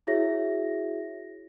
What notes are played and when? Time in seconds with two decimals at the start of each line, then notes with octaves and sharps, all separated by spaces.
0.07 E4 F#4 G#4 C#5 E5 A#6